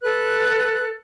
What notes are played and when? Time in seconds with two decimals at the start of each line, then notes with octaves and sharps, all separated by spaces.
0.02 A4 B4 F#6